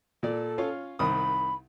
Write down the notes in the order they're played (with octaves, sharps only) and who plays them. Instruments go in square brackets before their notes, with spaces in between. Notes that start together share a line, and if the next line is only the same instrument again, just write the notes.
[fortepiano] A#2 D5 [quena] A4
[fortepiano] C#4 F4 F5
[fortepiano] C2 D#3 D#6 [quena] B5